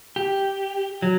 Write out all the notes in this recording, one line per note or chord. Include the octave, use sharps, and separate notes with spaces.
G4
F#3